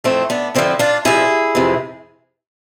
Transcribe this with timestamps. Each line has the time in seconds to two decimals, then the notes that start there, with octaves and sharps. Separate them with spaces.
0.04 F2 E3 A3 C4
0.30 B3 D4
0.55 F2 D3 F3 C4 E4
0.79 D4 F4
1.05 F2 C3 F3 E4 G#4
1.55 F2 C3 E3